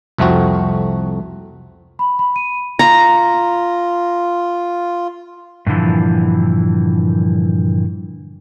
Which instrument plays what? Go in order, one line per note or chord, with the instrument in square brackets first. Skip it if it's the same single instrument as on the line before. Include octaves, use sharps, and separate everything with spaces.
[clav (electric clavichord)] C2 F2 A3 C4 F#4
[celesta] B5
B5
D#7
[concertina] F4 [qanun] A#5
[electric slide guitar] G2 A#2 D3 E3 F3